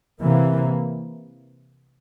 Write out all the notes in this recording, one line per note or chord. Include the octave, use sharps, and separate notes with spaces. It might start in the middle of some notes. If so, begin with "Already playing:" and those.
C3 E3 A#3